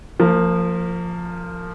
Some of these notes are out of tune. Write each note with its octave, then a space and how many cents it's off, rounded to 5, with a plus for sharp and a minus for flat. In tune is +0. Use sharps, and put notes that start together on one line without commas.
F3 +0 A#3 -35